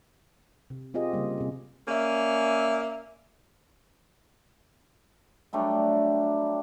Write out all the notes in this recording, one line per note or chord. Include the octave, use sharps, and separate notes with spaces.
C3
C4 F4 G4 G#4 D#5
C#3 G3 A#3
C3 G#4
A#3 C#4 D5 E5
F#3 G3 A3 D4